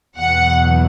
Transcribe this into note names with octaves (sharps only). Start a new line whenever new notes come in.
E2 B2 F#3 F#5